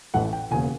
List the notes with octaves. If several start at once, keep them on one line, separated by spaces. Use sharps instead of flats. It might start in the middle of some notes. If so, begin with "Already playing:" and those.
A1 A2 E3 A3 F#5
G5
E1 D#2 C#3 G#5